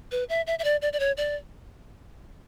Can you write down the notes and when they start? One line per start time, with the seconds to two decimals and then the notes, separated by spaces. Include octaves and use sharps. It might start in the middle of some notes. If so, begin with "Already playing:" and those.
0.12 B4
0.29 E5
0.47 E5
0.59 E5
0.64 D5
0.82 D5
0.93 D5
1.00 C#5
1.17 D5